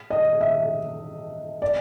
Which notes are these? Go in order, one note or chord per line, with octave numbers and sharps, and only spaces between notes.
D#5
E5
D5